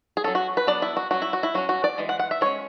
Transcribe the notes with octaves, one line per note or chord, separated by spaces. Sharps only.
G#4
F#3 C#4 A4
F#4
B4
F#3 B3 D4 D5
E4
F#4
F#3 C#4 F#4
E4
F#4
E4
F#3 C#4 F#4
F#4
D5
E3 G#3
F#5
F#5
E5
G#3 C#4 C#5